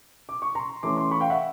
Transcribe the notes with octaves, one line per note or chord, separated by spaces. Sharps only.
D6
C#6
A#5 C6
E3 A3 C#4 C6 D6
C6 D6
B5 C#6
F5 G5
E5 F#5